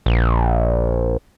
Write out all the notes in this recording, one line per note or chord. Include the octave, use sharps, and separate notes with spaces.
A#1